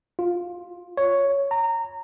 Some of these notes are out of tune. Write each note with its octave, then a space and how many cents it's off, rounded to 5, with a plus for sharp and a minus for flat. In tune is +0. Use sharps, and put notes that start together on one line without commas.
F4 +10
C#5 +5
A#5 -20